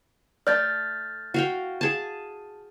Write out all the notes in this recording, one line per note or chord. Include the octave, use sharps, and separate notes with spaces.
A3 D5 F6 G6 A6
F#4 F5 G5
G#4 A5